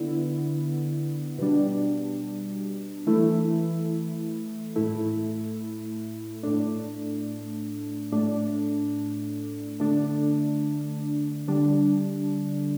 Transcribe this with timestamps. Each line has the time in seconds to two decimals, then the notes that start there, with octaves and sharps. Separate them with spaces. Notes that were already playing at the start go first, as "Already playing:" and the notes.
Already playing: D3 B3 E4
1.38 B2 G3 D4
3.07 E3 A3 E4
4.76 A2 A3 E4
6.43 A2 A3 D4
8.12 A2 A3 D4
9.80 D3 A3 D4
11.48 D3 G3 D4